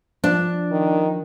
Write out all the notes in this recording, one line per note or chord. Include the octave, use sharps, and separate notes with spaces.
F3 D4
D#3